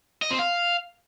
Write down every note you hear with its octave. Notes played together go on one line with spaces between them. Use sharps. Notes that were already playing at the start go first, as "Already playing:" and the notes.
D#5
C4
F5